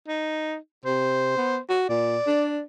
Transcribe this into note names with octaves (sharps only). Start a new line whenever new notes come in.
D#4
C3 C5
B3
F#4
A#2 D5
D4